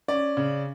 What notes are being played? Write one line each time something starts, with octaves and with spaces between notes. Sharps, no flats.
C#4 D5
C#3